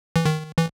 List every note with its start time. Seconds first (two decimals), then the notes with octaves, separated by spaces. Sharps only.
0.16 E3
0.25 D#3
0.58 E3